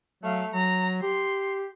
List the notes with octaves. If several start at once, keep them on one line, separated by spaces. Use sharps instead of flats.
F#3 A3 F5
F#3 A#5
G4 C6